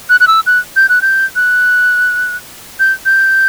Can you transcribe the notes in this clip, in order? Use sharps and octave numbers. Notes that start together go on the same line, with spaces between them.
F#6
F#6
E6
F#6
G6
F#6
G6
F#6
G6
G6